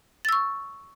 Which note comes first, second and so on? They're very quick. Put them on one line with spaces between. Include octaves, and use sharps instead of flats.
A6 E6 C#6